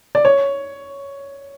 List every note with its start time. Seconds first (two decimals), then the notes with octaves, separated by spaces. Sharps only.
0.15 D5
0.25 C#5